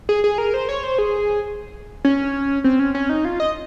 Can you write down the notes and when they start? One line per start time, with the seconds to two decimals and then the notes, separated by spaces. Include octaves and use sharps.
0.09 G#4
0.24 G#4
0.38 A#4
0.54 C5
0.69 C#5
0.83 C5
0.98 G#4
2.05 C#4
2.64 C4
2.79 C#4
2.95 C#4
3.09 D#4
3.25 F4
3.40 D#5